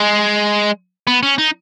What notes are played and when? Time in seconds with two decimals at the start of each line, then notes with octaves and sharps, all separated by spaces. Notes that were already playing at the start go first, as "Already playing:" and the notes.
Already playing: G#3
1.07 B3
1.23 C#4
1.38 D#4